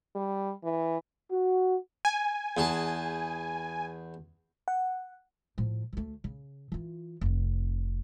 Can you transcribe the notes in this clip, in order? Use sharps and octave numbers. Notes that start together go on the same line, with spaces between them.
G3
E3
F#4
G#5
E2 G#4 A5
F#5
A2 F3
D2 A3
C#3
E3 F4
F1 C3